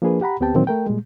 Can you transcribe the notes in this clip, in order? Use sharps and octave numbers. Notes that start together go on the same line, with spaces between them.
F3 A#3 D4 G#4 B4
G4 F#5 A#5 B5
D2 B3 C4 G4 G5 A5
A#2 D#3 E3 F#3 A#3 C4
A3 A#4 G5
A#2 G3 G#3